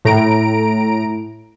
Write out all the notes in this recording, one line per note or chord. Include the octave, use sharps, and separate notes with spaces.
A2 A#5 D7